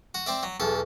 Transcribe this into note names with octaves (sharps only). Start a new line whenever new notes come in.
F#4
C4 D5 E5
F#3
B1 E2 A4